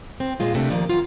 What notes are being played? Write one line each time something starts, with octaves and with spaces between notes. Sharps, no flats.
C4
D#2 A#2 G#3 F4
C3 A3 A#3 D4
D#3 F3 A#3 D5
D#3 E3 F#3 F4